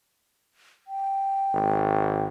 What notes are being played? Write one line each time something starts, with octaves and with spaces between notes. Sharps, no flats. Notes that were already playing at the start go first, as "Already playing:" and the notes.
G5
G#1